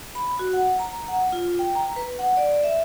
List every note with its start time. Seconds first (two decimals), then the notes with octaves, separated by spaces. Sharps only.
0.15 B5
0.39 F#4
0.53 F#5
0.79 A#5
1.08 F#5
1.32 F4
1.59 G5
1.75 A#5
1.96 B4
2.19 F#5
2.37 D5
2.64 E5